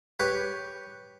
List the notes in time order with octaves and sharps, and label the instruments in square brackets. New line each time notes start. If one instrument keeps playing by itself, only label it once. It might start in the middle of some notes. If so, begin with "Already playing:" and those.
[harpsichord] G4 B4 C#5